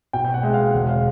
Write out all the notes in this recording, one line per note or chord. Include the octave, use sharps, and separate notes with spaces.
B2 G5
G5
F#5
G#3 E5
F5
E1
F5